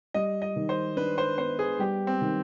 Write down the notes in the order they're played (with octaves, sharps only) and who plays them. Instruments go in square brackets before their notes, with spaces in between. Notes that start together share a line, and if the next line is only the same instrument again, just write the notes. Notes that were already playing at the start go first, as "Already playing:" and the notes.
[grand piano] G3 [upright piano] D#5
[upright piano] D#5
[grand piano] D#3
[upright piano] C5
[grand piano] D4 [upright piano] B4
[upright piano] C5
[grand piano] B3 [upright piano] C5
[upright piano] G#4
[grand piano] G3 [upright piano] G4
[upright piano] C4
[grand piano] D#3